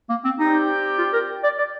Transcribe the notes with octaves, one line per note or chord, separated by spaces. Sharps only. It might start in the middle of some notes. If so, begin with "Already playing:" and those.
A#3
C4
C4 D#4 G4 D5 G5
F4
A#4
D5
D5